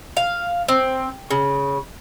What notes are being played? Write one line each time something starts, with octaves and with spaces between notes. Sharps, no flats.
F5
C4
C#3